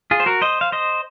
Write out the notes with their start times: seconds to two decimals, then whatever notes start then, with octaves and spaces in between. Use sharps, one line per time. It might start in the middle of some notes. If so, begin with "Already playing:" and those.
0.11 F4 G#4
0.20 C5
0.26 F#4 A#4
0.42 C5 D#5
0.61 F5
0.72 C5 D#5